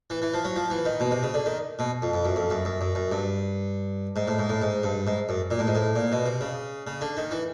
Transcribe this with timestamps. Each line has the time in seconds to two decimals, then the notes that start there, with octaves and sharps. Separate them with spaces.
0.10 E3
0.22 E3
0.34 F3
0.45 F#3
0.56 F3
0.70 E3
0.85 D#3
1.00 B2
1.11 C3
1.23 C#3
1.34 D3
1.46 D#3
1.79 B2
2.02 F2
2.13 F2
2.25 F#2
2.36 F2
2.50 F#2
2.65 F#2
2.81 F#2
2.95 F#2
3.12 G2
4.16 G#2
4.28 A2
4.39 G#2
4.50 A2
4.62 G#2
4.83 G2
5.07 G#2
5.29 F#2
5.51 A#2
5.59 A2
5.67 G#2
5.75 A2
5.96 A#2
6.12 B2
6.26 C3
6.41 C#3
6.87 C#3
7.01 D3
7.17 D#3
7.31 E3